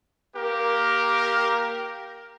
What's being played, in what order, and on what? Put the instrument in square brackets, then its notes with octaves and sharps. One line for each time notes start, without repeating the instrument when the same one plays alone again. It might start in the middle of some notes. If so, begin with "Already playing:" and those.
[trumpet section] A#3 G4 A#4